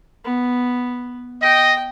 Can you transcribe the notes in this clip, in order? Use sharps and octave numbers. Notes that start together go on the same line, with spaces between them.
B3
D#5 G5